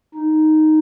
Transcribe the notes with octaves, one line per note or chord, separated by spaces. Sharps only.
D#4